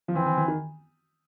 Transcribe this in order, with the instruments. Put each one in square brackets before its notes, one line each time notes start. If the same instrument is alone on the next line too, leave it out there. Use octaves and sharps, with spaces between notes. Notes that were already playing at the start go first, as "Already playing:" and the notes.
[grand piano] F3
[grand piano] E3 [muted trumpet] C4
[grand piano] E3
E3
D#3